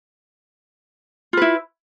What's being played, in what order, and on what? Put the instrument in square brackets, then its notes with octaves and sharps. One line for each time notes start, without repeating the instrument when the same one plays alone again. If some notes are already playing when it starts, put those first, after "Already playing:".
[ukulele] F4
B4
E4